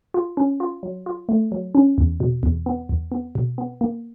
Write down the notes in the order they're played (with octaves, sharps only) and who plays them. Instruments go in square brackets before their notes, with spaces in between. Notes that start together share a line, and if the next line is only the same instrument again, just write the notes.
[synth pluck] F4
C#4
F4
F#3
F4
A3
F#3
C#4
E2
B2
E2
B3
E2
B3
B2
B3
A#3